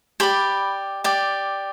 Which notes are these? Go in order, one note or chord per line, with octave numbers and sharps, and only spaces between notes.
G4 D5 B5
G4 D5